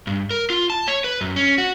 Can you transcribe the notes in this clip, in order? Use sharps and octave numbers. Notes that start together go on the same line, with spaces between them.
G2
A#4
F4
A5
C#5
B4
F#2
C#4
F#4